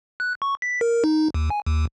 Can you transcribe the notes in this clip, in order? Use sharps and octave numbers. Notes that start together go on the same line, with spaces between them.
F#6
C#6
B6
A#4
D#4
D#2
G#5
D#2